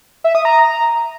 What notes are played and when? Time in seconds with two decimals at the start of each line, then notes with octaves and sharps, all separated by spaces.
0.24 E5
0.35 D#6
0.45 A#5